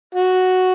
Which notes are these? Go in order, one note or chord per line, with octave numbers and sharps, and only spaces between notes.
F#4